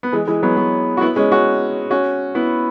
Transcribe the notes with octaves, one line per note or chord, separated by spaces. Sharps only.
B3
E3 G#3
E3 G#3
F#3 B3
F#3 B3
F#4
B3 E4
G#3 C#4
C#4 F#4
C#4 F#4
B3 E4